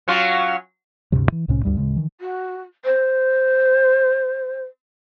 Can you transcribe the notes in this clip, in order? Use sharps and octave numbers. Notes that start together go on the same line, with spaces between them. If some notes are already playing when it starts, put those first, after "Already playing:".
F#3 C#4 F4
D2 G2 C3 F#3
E3
C2 A2 C3 C#4
D2 G2 G3
D1 G#1 C#3 G#3
D#3 E3
F#4
C5